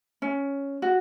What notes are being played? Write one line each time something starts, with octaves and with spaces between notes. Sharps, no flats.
C#4
F#4